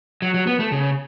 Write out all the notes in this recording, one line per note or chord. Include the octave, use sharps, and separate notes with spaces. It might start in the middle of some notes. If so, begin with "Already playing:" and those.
F#3
F#3
B3
A3
C#3